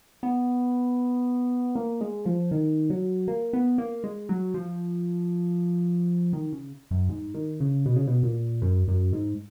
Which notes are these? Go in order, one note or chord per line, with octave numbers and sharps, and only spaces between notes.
B3
A#3
G#3
F3
D#3
F#3
A#3
B3
A#3
G#3
F#3
F3
D#3
C#3
F#2
G#2
D#3
C#3
B2
C#3
B2
A#2
F#2
F#2
G#2